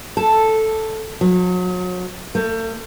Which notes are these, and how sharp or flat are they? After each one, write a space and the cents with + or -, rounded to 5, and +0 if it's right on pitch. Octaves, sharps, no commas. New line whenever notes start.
A4 +0
F#3 -35
A3 +40